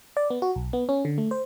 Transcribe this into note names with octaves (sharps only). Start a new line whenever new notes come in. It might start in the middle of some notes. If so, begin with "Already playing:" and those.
D5
B3
F#4
B1
B3
C#4
D3
A3
C5